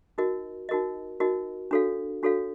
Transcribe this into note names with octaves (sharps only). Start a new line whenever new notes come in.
D#4 F#4 A#4 D#5
D#4 F#4 A#4 D#5
D#4 F#4 A#4 D#5
D4 F#4 A4 C#5 F5
D4 F#4 A4 C#5 F5